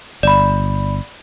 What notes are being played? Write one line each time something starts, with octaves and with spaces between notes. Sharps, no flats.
G1 D5 B5